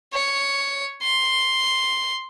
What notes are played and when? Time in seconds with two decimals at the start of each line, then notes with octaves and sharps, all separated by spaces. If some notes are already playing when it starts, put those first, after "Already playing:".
0.13 C#5
1.03 C6